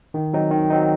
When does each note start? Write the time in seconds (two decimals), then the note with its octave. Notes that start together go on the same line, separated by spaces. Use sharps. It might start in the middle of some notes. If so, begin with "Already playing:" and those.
0.14 D#3
0.33 F#3 C4 D#4
0.51 D#3
0.70 F#3 C4 D#4